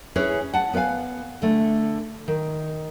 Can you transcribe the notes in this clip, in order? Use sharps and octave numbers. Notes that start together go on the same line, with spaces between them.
C#4 E4 G#4 B4 C#5
F#5 A5
B3 B4 D5 F5 G#5
D3 A3
D#3